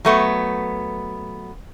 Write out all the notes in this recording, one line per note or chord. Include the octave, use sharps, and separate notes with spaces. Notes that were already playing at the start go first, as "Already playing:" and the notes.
F#3 A3 B3